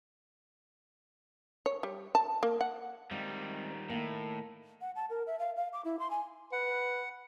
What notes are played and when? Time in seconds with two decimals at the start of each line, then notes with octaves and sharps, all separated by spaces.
1.66 C#5
1.83 G3
2.15 A5
2.43 A#3
2.61 F#5
3.11 D#3 G3 G#3 C4 F5
3.90 A2 D#3 A#3
4.81 F#5
4.96 A5
5.10 A#4
5.27 E5
5.39 F5
5.56 F5
5.73 D6
5.85 E4
5.99 C6
6.11 G#5
6.52 B4 F#5